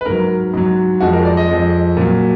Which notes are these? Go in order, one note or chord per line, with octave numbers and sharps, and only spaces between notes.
B4
G#2 F#3 A#4
G#2 F#3
F2 F3 G#3 F#4
A#4
D5
D#5
F2 F3 G#3
A#2 F#3